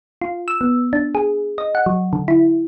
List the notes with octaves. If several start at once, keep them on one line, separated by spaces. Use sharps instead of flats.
F4
E6
B3
D4
G#4
D#5
F#5
F#3
D3
E4